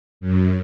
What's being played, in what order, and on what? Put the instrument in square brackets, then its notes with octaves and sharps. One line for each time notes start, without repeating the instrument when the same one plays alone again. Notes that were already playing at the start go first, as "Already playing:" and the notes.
[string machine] F#2